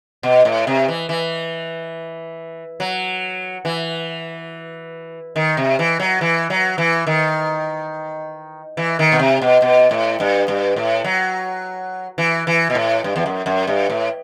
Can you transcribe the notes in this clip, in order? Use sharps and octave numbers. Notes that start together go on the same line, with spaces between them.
B2
A2
C3
E3
E3
F#3
E3
D#3
C3
E3
F#3
E3
F#3
E3
D#3
E3
D#3
B2
C3
B2
B2
A2
G2
G2
A2
F#3
E3
E3
B2
A2
G2
E2
F#2
F#2
G2
A2